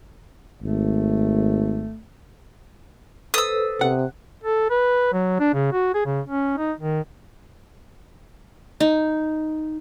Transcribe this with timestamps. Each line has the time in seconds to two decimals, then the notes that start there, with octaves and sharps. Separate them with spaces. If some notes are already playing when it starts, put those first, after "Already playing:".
0.63 G#1 A3
3.34 A4 B4 C5 D#6 E6
3.81 C3 F#5
4.44 A4
4.70 B4
5.13 F#3
5.40 D4
5.54 C#3
5.72 F#4
5.94 G#4
6.06 C#3
6.27 C#4
6.58 D#4
6.80 D#3
8.80 D#4